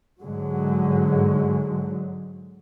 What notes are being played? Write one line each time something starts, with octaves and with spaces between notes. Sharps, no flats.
G#2 D3 F#3 G#3